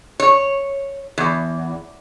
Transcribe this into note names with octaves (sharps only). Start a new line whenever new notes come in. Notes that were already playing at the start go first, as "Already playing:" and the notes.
C#5
E2